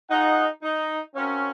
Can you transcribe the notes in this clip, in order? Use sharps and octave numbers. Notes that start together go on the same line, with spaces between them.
D#4 F4 G#4 D#5 F#5
D#4
C4 C#4 F#4 A#4 C#5 F5